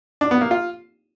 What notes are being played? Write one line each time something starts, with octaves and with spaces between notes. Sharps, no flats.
D4
B3
A#3
F4